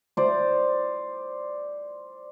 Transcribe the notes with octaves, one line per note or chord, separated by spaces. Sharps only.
C5 D5